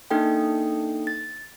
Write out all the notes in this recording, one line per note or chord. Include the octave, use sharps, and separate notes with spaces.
A#3 D4 D#4 A4 G5
A6